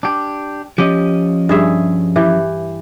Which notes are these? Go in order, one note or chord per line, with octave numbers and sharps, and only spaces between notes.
D4 G4
F3 C#4 G4 D#5
G2 G#4 E5
E3 G4